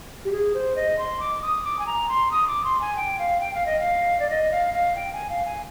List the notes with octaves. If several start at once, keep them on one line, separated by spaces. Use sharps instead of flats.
G4
G#4
C5
D#5
C6
D6
D#6
D6
G#5
A#5
C6
D#6
D6
C6
G#5
G5
F5
G5
F5
D#5
F5
D5
D#5
F5
F5
G5
G#5
F5
G#5